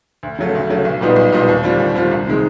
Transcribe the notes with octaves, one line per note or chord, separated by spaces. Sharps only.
D2
C#3 F#3 A3
D2
C#3 F#3 A3
B1
A#2 G3 B3 D#4
B1
A#2 G3 B3 D#4
D#2
D3 G3 C4 F4
D#2
D3 G3 C4 F4
C2
C3 D#3 G#3 C4